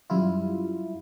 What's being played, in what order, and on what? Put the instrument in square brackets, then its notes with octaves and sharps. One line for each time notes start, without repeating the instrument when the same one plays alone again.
[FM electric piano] F#2 G3 E4 F4